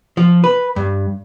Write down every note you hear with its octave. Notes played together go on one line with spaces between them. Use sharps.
F3
B4
G2